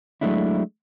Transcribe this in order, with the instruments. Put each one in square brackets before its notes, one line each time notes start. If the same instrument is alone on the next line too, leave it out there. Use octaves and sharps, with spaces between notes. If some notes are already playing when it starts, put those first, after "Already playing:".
[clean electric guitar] F#3 G#3 A3 D4 E4